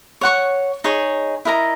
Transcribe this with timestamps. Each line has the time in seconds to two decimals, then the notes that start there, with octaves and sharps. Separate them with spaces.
0.21 C#5 F#5 C#6
0.84 D#4 G#4 C#5
1.45 E4 A#4 D#5 A#5